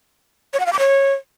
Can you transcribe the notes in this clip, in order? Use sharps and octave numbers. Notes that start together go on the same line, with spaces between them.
C#5
F#5
F5
D6
C#5